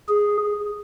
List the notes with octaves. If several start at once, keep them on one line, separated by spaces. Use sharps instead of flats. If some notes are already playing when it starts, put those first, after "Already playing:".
G#4